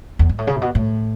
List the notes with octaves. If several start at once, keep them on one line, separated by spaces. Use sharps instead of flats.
E2
G#2
A2
C#3
A2
B2
A2